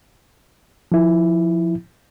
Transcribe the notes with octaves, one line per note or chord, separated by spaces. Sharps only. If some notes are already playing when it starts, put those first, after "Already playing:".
F3 E4